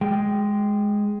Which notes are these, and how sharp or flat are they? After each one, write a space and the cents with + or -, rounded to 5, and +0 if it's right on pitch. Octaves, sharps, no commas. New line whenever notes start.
G#3 +0 G5 +0